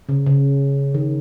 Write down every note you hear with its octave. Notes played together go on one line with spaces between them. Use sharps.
C#3
C#3
D#3